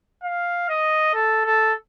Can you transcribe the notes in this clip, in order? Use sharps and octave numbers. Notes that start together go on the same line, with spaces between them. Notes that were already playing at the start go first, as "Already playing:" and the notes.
F5
D#5
A4
A4